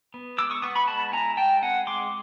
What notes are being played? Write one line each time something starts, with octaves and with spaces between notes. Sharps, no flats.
B3
G#3 D6 E6
C#6 D#6
B3 C#6 D#6
B5 C#6
G#3 A5 B5
E4 G#5 A#5
G#3 G5 A5
C4 F#5 G#5
G#3 C6 D6